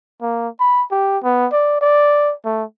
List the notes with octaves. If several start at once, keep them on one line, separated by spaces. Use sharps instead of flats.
A#3
B5
G4
B3
D5
D5
A3